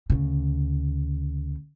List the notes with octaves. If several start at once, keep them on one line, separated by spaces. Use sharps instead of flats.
D2 C#3